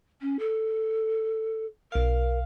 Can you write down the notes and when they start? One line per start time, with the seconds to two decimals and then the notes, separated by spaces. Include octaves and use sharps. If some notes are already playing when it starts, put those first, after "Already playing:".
0.21 C#4
0.39 A4
1.92 B1 A#4 F5